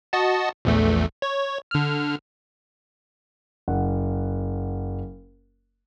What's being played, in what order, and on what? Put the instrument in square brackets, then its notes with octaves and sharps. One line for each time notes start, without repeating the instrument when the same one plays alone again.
[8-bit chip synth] F#4 D#5 A5
A#1 E2 A3
C#5
D3 F6
[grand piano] F#1 F#5